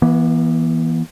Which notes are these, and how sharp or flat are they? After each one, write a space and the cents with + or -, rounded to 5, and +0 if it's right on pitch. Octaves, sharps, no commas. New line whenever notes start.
E3 +0 B3 -40